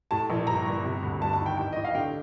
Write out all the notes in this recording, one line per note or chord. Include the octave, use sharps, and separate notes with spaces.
A2 A5
A#1
G1 A#5
G1
C3
D2
G1 A5
A5
D#3
G5
A1 G5
A1 D#5
F5
D3 G5